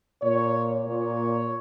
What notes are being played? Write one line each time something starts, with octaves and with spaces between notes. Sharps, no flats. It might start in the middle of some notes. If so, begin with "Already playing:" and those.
A#2 C#5
A#2 C#5